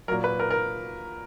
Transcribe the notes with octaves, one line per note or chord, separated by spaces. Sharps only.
A#2 F#3 A#4
B4
A#4
A#4